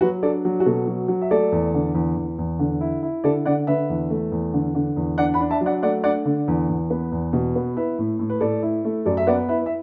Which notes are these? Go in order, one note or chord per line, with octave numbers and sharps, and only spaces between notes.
F#3 F#4 B4
D4 A4 D5
F#3
F#4
B2 A4
F#3
F#3
E5
A3 A4 D5
E2
D3
E2
E2
E2
D3
E4
E4
D3 A4 D5
D3 D5 F#5
D3 B4 E5
E2
A3
E2
D3
D3
E2
D4 D5 F#5
F#5 B5
D4
E5 A5
F#3
D5 F#5
A3 D5 F#5
D4 D5 F#5
D3
E2
E2
B3
E2
B2
B3
E4 B4 E5
A2
A2
B4
A2 A4 D5
E4
A3
F#2 A4 D5
E5
B3 D5 F#5
E4 B4 E5
E5